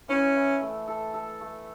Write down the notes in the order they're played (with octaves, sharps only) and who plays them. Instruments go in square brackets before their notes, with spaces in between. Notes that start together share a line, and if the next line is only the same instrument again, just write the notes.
[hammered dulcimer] E3 [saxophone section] C#4
[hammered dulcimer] E3
A3
A4
A4
A3